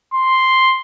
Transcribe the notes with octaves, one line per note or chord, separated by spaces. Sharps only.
C6